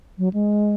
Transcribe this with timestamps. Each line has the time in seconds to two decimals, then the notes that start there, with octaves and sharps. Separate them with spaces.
0.18 F#3
0.33 G#3